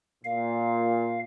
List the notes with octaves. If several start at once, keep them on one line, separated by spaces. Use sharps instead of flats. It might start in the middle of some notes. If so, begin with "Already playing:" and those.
A#2 F5